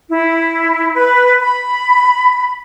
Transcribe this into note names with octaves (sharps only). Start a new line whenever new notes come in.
E4
B4
B5